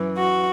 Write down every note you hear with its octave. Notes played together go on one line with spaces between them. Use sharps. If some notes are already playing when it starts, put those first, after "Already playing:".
Already playing: F#2 E3
F#4